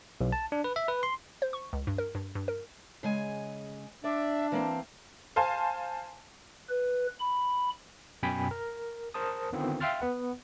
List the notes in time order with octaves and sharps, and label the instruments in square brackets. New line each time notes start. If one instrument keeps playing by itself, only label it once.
[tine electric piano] B1
A5
D4
B4
E5
B4
C6
[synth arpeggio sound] C5
C#6
C#2
G2
A#4
G2
G2
A#4
[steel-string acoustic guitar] C#3 G#3 G#5
[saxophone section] D4 [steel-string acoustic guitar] D5 [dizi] E5
[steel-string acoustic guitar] E3 A#3 C4 [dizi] A5
[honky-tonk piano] C5 F5 G#5 A5 C6
[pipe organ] B4
B5
[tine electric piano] F#2 B2 G5 G#5 B5 B6
A#4
A#4 C5 A5 D#6
D3 D#3 B3 C4 F4
E5 F5 G5 C6 F6 A6
B3 B4 F#5